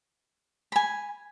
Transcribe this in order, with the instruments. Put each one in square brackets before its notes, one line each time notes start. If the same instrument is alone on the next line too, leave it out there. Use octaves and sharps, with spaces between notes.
[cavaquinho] G#5 B5